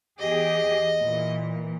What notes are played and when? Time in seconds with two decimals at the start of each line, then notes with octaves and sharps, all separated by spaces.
0.19 E2 G4 G#4 D#5
0.99 A#2 E3